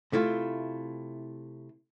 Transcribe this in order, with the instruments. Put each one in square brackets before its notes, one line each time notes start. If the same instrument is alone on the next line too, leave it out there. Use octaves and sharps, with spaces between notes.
[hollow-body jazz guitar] C3 A3 E4 F4